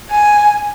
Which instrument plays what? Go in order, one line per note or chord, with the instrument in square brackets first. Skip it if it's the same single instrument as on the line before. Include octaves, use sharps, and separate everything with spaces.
[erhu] G#5